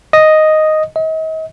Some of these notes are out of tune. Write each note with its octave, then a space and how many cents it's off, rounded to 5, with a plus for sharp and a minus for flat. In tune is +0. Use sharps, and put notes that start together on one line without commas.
D#5 +0
D#5 +40